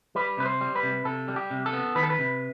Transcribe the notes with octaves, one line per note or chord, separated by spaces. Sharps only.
G3 B4
C3 B4
C5
G3
B4
C3
C3 A4
G3
G4
C3
A4
B3
D#3 B4
A4
B4
C3